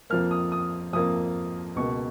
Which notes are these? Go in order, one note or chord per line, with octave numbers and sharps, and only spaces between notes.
F2 F3 A#3 F6
D#6
D#6
F2 F3 A#3 D#6
C#2 B2 A#3 C#6